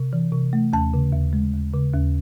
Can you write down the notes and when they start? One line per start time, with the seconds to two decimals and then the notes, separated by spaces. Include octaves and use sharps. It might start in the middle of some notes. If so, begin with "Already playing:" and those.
Already playing: C3
0.13 E3
0.32 C3
0.53 A3
0.73 D#2 A5
0.94 C#3
1.13 D#2
1.33 G#3
1.53 D#2
1.74 C#3
1.94 D#2